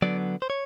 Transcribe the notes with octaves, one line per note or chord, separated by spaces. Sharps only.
D3 F#3 B3 D4 D5
C5
C#5